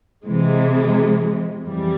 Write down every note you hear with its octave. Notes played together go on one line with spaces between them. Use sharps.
C3 E3 G#3
F2 E3 G3